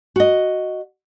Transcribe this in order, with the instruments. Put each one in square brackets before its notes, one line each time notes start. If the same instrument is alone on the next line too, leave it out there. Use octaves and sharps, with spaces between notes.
[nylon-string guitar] F#4 D#5